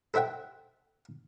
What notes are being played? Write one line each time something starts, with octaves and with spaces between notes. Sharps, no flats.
A4 C5 E5 F#5 G5